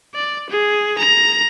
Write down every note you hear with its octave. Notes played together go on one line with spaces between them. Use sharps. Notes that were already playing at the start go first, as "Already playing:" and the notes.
D5
G#4
A#5